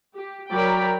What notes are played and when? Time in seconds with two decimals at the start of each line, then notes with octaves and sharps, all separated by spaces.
0.14 G4
0.50 F#3 A#4 D5 G5 B5